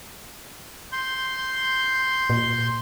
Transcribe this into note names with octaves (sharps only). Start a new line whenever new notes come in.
C6 G6
A#2